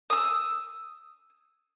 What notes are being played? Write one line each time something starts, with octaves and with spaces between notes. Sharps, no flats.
D#6 E6